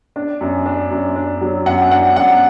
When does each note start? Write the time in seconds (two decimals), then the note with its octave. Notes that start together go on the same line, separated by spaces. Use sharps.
0.16 D4
0.41 F#2
0.66 D4
0.91 F#2
1.16 D4
1.41 F#3
1.66 F#2 F#5
1.91 D4 F#5
2.16 F#2 F#5